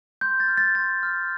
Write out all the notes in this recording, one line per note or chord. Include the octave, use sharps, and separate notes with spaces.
C6 G6
A6
F6
A6
C6 A6
F6